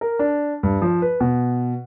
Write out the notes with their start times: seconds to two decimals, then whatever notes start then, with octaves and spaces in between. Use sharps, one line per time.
0.01 A#4
0.19 D4
0.63 G2
0.82 F3
1.02 B4
1.21 B2